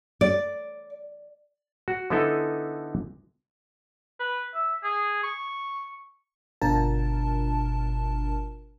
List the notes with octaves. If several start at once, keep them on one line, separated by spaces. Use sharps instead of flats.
D5
F#4
D3 B3 D#4 E4 A4 G#5
B4
E5
G#4
C#6
G1 B2 D4 F4 A#4 A5